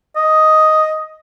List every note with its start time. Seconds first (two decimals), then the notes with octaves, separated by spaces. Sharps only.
0.16 D#5